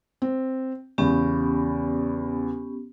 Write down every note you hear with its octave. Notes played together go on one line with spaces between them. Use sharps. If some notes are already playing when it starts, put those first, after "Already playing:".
C4
E2 C#3 B3 C#4 G4